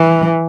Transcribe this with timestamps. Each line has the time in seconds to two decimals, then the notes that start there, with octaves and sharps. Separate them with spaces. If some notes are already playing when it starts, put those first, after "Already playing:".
Already playing: E3